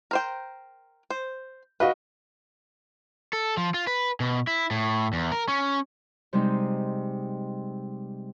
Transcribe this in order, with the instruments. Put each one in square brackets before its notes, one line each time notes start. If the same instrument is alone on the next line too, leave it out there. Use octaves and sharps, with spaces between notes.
[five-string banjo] A#4 C5 G5
C5
[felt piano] F#4 D#5 F5 [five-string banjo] B4
[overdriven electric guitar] A4
F3
F4
B4
B2
E4
A2
E2
A#4
C#4
[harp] C3 G3 G#3 C4 D#4